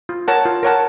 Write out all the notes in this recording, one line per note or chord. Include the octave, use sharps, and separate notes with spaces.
F4
A#4 C#5 F#5 A5
F4
A#4 C#5 F#5 A5